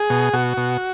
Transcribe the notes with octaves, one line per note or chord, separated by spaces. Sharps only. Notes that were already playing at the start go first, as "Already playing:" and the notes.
Already playing: G#4
B2
B2 F#4
B2